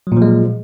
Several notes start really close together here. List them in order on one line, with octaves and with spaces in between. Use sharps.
F#3 A#2 F3 G#3